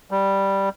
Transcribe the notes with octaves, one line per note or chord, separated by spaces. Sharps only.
G3